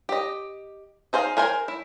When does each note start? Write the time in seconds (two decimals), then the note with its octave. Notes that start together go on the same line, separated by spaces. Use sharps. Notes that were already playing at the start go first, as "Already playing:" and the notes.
0.09 G4 D#5
1.13 D#4 G#4 C5 F5
1.37 G#4 A#4 C5 G#5
1.68 E4